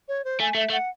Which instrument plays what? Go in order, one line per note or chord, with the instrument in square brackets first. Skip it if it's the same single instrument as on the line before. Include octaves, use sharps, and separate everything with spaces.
[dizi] C#5
C5
[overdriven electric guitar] A3 [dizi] G#5
[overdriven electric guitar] A3 [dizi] E5
[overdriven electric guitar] A3
[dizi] F#5